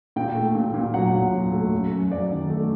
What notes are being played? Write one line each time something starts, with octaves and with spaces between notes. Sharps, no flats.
A#2 G5
A3
A#2
A#2
F#3 F#5
A#2
F#3
A3
F#2
F#2
F#2 D5
D#3
A3